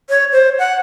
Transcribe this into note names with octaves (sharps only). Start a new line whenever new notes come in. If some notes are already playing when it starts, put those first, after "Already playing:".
C#5
C5
F#5